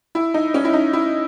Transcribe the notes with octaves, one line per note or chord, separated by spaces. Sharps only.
E4
D#4
C#4
E4
D#4
E4